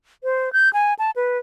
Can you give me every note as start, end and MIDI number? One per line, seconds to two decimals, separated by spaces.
0.24 0.52 72
0.53 0.71 91
0.73 0.94 80
0.99 1.11 81
1.16 1.38 71